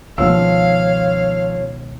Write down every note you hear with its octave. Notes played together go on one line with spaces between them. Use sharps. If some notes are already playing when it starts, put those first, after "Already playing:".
C#2 B2 D#3 F3 F4 C#5 F5 E6